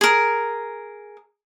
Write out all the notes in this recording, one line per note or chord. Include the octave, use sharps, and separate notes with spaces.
G#4 A#4